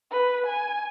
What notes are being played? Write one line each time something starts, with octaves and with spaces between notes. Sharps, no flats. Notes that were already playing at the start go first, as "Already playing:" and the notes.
B4
G#5